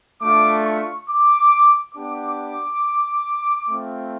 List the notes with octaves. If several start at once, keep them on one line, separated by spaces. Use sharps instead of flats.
A3 D4 F4 D6
C#6
D6
B3 D4 G4 D6
A3 C4 F4